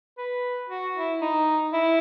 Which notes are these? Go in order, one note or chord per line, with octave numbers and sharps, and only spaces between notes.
B4
F#4
E4
D#4
E4